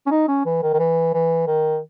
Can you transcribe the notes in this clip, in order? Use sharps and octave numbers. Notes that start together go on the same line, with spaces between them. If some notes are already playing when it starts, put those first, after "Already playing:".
C#4
D#4
C#4
E3
D#3
D#3
E3
E3
D#3